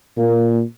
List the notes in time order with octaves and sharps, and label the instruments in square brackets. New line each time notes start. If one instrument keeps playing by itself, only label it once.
[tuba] A#2 [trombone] A#3